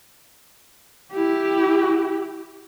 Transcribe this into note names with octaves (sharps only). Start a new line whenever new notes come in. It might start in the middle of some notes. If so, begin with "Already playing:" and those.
E4 G4